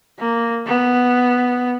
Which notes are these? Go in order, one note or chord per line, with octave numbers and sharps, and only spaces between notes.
A#3
B3